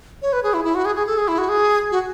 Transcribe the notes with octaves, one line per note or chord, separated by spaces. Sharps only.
C#5
B4
G#4
E4
E4
F#4
G#4
G#4
A4
G#4
E4
F#4
G#4
F#4